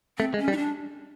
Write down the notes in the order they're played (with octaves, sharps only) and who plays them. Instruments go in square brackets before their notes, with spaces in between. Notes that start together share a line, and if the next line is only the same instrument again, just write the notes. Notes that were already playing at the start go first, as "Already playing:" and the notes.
[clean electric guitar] A3 [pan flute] C4
[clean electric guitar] G#3
[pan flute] C#4
[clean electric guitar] G3
[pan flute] D#4
D4